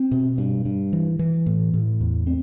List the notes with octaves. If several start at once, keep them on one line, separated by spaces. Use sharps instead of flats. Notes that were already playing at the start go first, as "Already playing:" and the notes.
Already playing: C4
B2
G2
G2
E3
E3
A2
A2
E2
C4